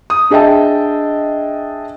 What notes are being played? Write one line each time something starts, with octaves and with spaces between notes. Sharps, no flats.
D#6
D4 G#4 D#5 E5 G5 A5